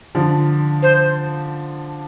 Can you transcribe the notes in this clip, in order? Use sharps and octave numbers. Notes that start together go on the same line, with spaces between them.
D3 F3
C5